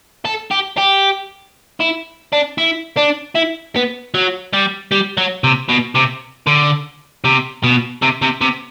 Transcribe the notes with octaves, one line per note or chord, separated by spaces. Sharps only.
A4
G4
G4
E4
D4
E4
D4
E4
B3
F#3
G3
G3
F#3
C3
B2
C3
D3
C3
B2
C3
C3
C3